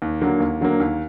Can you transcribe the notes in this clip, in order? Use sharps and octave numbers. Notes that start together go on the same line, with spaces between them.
D#2
D3 F#3 A#3
D#2
D3 F#3 A#3
D#2